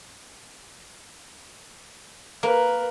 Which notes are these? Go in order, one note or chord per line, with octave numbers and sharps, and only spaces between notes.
A#3 A#4 B4